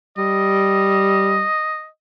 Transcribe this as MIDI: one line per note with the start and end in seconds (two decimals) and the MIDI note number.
0.18 1.46 55
0.18 1.87 75